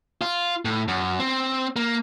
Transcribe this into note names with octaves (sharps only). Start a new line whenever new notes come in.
F4
A2
F#2
C4
A#3